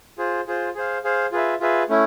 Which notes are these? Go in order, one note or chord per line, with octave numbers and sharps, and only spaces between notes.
F4 G#4 C5
F4 G#4 C5
G#4 C5 F5
G#4 C5 F5
F4 G#4 B4 E5
F4 G#4 B4 E5
A3 C#4 E4